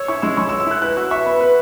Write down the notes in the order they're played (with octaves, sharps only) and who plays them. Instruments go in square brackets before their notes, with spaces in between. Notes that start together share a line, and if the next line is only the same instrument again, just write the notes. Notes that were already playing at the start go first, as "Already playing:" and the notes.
Already playing: [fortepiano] C#5 [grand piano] E6
[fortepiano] E4 [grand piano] C#6
[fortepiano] G#3 [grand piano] E6
[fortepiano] G#3 [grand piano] C#6
[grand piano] E6
[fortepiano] C#5
[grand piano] E6
[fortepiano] E4 [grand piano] F#6
[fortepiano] B4 [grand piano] F#6
[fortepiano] F#4 [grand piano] E6
[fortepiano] E5 [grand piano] C#6
[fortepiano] B3 [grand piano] B5
[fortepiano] B4